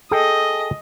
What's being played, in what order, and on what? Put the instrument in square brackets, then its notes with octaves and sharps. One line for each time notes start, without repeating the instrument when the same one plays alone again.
[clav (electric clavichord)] G#4 A4 G5 [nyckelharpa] D#5